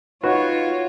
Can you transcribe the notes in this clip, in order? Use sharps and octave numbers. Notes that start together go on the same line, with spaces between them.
D#4 F4 F#4 B4 C#5